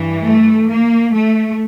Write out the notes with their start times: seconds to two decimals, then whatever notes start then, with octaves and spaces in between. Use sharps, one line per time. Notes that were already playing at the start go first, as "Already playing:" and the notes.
Already playing: G2 E3
0.23 A3
0.70 A#3
1.14 A3